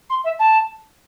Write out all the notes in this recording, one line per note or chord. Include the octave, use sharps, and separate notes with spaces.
C6
E5
A5